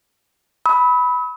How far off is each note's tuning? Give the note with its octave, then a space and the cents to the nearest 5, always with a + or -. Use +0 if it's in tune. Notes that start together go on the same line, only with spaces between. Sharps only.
B5 +0 E6 -45